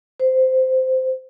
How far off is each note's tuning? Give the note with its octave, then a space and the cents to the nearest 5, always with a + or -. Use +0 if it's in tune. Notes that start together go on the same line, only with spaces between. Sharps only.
C5 -15